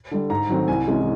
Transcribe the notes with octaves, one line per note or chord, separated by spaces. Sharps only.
D3 G3
G#2 A#5
D#3 F#3 A3 C4
C2 G#5
C3 E3 G#3 C#4